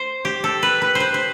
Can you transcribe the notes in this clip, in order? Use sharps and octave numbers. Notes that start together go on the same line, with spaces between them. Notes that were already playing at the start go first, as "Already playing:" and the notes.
Already playing: C5
G4
A4
B4
B4
C5
B4
C5